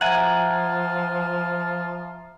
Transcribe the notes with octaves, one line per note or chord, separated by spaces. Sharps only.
F3 F4 E5 F#5 G#5 A#5 G#6